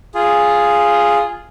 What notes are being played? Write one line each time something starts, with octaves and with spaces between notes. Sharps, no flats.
F4 G#4